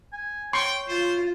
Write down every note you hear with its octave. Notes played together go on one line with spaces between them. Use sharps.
G#5
C#5 G5 C6 C#6
F4 C5